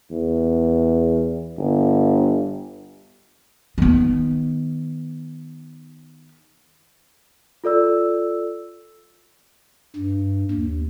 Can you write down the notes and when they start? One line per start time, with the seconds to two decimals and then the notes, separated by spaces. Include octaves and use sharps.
0.10 E2
1.58 G1
3.78 D#3 B3
7.64 F4 A4 D5 E6
9.96 G2
10.51 D#2